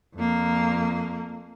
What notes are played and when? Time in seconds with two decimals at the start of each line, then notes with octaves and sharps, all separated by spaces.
0.15 F2 A#3